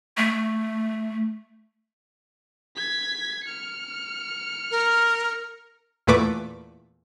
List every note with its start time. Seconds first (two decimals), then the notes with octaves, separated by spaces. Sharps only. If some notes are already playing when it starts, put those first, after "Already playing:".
0.17 A3
2.76 G#6 B6
3.45 F6 C#7
4.71 A#4
6.07 E2 A#2 A3 B4 C#6 D6